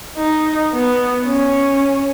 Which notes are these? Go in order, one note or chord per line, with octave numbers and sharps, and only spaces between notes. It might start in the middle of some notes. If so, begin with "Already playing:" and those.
D#4
B3
C#4